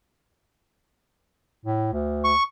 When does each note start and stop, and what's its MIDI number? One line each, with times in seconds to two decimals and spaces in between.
1.66 1.91 45
1.93 2.33 38
2.24 2.43 85